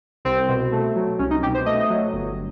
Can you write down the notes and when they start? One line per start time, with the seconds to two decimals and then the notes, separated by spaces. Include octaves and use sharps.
0.25 C2 C4
0.48 B2
0.72 A3
0.96 F#3
1.19 C2 C#4
1.31 D#4
1.43 B2 G4
1.54 C5
1.66 A3 D#5
1.90 F#3
2.13 G1